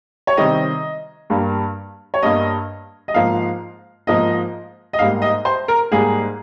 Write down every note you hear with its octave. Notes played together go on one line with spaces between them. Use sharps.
C#5
C3 D#3 G3 C4 D#5
G2 G3 A#3
C#5
G2 G3 A#3 D#5
D#5
G#2 F3 A#3 F5
G#2 F3 A#3 D#5
D#5
G#2 G3 A#3 F5
D#5
C5
A#4
G#2 G3 A#3 G#4